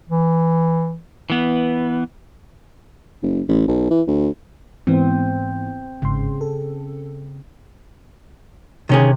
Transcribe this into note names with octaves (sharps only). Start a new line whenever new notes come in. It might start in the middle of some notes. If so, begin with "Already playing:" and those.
E3
E3 B3
F#1
A1
B1
E3
D2
G#2 E3 B3 C4
G1 G#2 C#3 C6
A4
C3 D#3 C#4 G#4